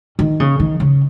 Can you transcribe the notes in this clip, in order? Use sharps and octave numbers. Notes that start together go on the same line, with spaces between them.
D#3
C#3
D#3
C#3